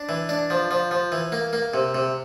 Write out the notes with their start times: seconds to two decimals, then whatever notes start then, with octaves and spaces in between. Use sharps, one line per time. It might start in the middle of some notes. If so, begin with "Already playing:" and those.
Already playing: D4
0.09 E3
0.29 D4
0.50 F3
0.71 F3
0.91 F3
1.12 E3
1.32 A#3
1.53 A#3
1.74 C3
1.95 C3